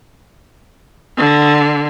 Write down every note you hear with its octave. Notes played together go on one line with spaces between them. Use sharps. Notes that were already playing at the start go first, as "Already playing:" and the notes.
D3